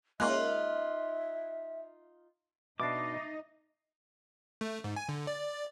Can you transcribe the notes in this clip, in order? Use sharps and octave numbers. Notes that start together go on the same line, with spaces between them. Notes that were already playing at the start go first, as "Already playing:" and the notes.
G#3 A#3 C#4 D#4 F4 E5 C6 F#6
B2 D4 D#4 D#5 E5 D6 A6 C7
A3
G#2
G#5
D3
D5